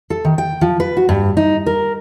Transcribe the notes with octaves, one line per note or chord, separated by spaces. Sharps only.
A4
D#3
G5
F3
B4
F#4
G2
D#4
A#4